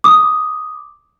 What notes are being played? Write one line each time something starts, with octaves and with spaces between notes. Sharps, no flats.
D6 D#6